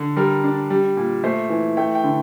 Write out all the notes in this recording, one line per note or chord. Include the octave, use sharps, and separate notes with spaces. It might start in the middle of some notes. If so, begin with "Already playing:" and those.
Already playing: D3
G3 A#4
D4
G3
A#2
A3 C5
E3
A3 G5
G5
D3